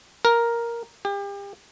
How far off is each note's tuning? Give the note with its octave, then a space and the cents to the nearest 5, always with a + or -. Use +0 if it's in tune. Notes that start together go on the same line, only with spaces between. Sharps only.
A#4 +5
G4 +35